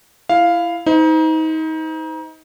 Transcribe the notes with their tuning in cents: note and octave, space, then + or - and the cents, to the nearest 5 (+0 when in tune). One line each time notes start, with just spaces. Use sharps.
E4 +20 F5 +0
D#4 +30 C5 -30